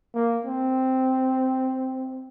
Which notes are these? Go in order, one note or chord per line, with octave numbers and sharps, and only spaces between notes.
A#3
C4